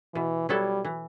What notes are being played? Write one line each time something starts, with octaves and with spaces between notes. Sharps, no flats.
B2 E3
F#3 G3 B3 E4 A4
E3